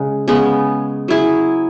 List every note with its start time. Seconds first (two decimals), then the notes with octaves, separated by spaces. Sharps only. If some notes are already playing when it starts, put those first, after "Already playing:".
Already playing: C#3 G#3
0.28 C#3 G#3 B3
1.08 F#3 E4 G#4